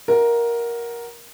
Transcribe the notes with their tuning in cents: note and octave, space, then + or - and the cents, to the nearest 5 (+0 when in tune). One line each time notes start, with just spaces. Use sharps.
F#4 +0 A#4 +10 E5 +0